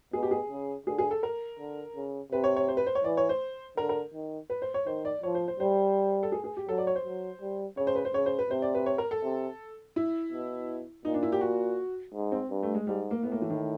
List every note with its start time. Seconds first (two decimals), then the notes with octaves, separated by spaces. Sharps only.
0.13 B2 G#4
0.23 G4
0.31 G#4
0.50 C#3
0.86 D3 G#4
0.98 G#4
1.11 A4
1.23 A#4
1.59 D3
1.96 C#3
2.32 C3 B4
2.44 C#5
2.56 C#5
2.68 C5
2.77 B4
2.86 C5
2.95 C#5
3.04 E3 D5
3.17 C#5
3.29 C5
3.77 D3 A#4
3.89 A#4
4.14 D#3
4.50 B4
4.62 C5
4.74 C#5
4.86 D#3 C5
5.05 D5
5.23 F3 C#5
5.35 C5
5.48 C5
5.60 G3 C5
6.23 A4
6.32 G#4
6.44 G#4
6.57 G4
6.69 F#3 A4
6.78 D5
6.87 C#5
6.96 C5
7.05 F#3
7.41 G3
7.77 C#3 C#5
7.87 C5
7.95 B4
8.05 C5
8.14 C#3 C#5
8.26 C5
8.39 B4
8.50 C3 C5
8.62 D5
8.75 B4
8.86 C#5
8.98 A#4
9.11 A4
9.23 C3
9.96 E4
10.32 B2
11.05 A#2 D#4
11.14 D4
11.23 E4
11.32 G4
11.41 F#4
12.14 G#2
12.32 C4
12.50 G2
12.63 A3
12.74 G#3
12.87 G#2 G3
13.11 A#3
13.23 A2 B3
13.32 A#3
13.42 E3
13.50 D#3